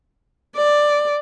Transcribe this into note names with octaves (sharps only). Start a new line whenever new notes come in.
D5